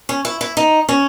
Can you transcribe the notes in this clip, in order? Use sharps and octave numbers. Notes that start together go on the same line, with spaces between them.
C#4
E4
E4
D#4
C#4